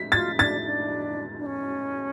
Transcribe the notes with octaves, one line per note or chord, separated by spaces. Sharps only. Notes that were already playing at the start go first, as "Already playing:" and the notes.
Already playing: B6
F4 A6
D4 A6
D4
D4
C#4